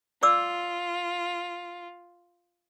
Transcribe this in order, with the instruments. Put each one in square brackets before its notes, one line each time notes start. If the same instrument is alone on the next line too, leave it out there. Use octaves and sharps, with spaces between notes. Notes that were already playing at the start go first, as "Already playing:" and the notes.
[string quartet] F4 [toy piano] D5 D6 E6